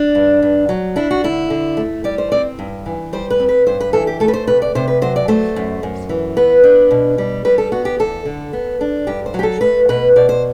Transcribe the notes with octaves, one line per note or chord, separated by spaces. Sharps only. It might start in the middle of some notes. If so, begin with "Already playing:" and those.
Already playing: D4
G2
G2
F#3
D4 E4
F#4
D3 E4
D3
A3
G3 D5
C5
C4 D5
G2
E3
G3 C5
B4
C4
B4
G2 C5
B4
E3 A4
G4
A3 A4
B4
C5
C3 B4
D5
C3 C5
B4
F#3 C5
D5
A3 C5
F#2
F#2
E3
B3 B4
D4
B2
G3
G3 B4
A4
B3 F#4
G4
E2 A4
D3
B3
D4
G2 G4
C5
F#3 G4
A4
A3 B4
B2 B4
B2 D5
C5